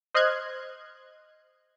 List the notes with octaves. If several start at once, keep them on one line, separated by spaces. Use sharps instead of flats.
C5 D#5 C6 F6 F#6 G#6